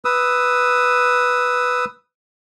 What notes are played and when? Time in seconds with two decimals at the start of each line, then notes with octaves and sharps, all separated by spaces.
0.05 B4 D#6 E6